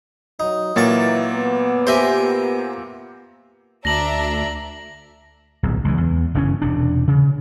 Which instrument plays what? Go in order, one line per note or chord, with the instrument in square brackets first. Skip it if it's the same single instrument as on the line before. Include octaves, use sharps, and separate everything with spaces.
[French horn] F#3 [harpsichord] D#4
[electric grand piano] A#2 A#3 A6 [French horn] E3 [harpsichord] F#3 C#6
[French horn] B3
[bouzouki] G4 A#4 G#5 [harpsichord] C5 E5
[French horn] B3
[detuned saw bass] D2 [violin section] D4 E5 A#5 [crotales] A#6 F#7
[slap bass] D1 B1
C#2 E3
E2
F#1 G2 E3 C#4
E1 C3 D4
C#3